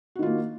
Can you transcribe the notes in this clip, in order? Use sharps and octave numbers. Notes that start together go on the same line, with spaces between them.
D#3 A#3 F4 F#4